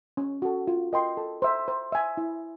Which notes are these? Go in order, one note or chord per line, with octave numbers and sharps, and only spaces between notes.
C#4
F#4 A4
F4
A#4 D#5 G5 C6
A4
C5 E5
C5
E5 G#5
E4